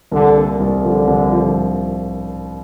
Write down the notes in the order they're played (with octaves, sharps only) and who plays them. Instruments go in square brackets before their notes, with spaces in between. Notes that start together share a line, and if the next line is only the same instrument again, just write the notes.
[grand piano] C2 [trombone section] D3
[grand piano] A#3
C2
[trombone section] D3 [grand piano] F3
[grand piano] C2
F3